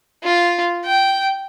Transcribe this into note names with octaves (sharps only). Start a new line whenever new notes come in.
F4
G5